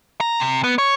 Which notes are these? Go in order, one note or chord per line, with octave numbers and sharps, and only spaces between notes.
A#5
C3
B3
C#5